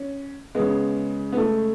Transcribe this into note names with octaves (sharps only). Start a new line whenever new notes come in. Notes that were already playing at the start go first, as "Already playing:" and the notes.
Already playing: C#4
C#3 G#3 B3
B3
A3